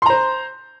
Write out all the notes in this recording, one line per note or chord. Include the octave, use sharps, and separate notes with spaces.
C5 A#5 C6